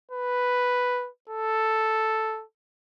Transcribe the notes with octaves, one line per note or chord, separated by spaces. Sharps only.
B4
A4